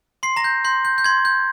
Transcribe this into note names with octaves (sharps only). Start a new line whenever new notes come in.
C6 C7
A#5 A#6
G6
C6 G6
G6
G6
C6 G#6
G6